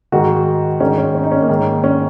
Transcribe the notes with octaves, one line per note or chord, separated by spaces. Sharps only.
G#2 D#3 F#4
G#2 D#3 C#4
C#4
C#4
D#4
C#4
A#3
G#2 D#3
C#4